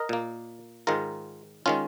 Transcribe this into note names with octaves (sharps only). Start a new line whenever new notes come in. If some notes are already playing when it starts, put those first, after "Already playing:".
Already playing: A#4 D#5
A#2 A#3
G#2 D#3 G#3 F4 A#4
D#3 G#3 C#4 F4